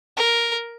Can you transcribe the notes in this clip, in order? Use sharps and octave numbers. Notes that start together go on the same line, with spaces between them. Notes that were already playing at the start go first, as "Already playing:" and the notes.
A#4